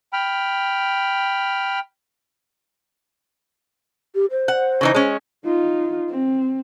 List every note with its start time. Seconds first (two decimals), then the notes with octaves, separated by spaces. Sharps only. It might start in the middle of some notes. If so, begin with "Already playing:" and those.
0.13 G5 B5 F6
4.15 G4
4.31 C5
4.48 F#5
4.81 C#3 E3 D#4
4.94 G#3 C#4
5.45 D#4 F4
6.10 C4